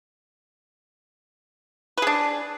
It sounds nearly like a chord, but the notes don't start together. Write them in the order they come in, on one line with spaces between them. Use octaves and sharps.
B4 G#4 D4